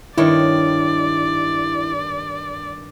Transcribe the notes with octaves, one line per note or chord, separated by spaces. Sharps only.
G2 D#3 E4 C#5 D5